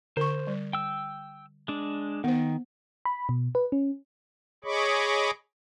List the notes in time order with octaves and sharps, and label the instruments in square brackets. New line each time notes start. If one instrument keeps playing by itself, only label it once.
[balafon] D3 C#6 [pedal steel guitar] C5
[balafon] G3
[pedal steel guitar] G5 E6
G#3 D4
[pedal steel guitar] D#3 [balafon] B3 C5
[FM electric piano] B5
B2
B4
C#4
[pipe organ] G#4 C#5 D#5 B5 C#6 D6